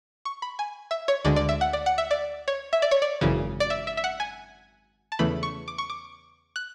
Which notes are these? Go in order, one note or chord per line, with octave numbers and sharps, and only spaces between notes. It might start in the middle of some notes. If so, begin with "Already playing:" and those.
C#6
B5
G#5
E5
C#5
D2 D3 G#3 D5
D5
E5
F#5
D5
F#5
E5
D5
C#5
E5
D5
C#5
D5
G#1 F#2 C#3 E3
D5
E5
E5
E5
F#5
G#5
A5
E2 C#3 E3 A3 B5
C#6
D6
C#6
D6
F#6